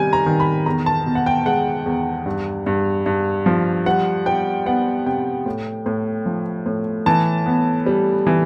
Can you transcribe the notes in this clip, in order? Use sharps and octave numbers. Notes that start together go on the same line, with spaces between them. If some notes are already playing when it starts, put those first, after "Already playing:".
Already playing: C3 D#3 G3 G#5
A#5
D#3
B5
E2 A#5
A5
B2
F#5
G5
G#3 F#5
E2
G2
G2
G2
F3
G3 F#5
G3 G5
B3 F#5
C3 G5
A2
A2
F3
A2
E3 A5
B3
G3
E3